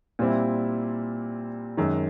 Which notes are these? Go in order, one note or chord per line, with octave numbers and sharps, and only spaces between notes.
A#2 G3 C4 E4
F#2 D#3 G#3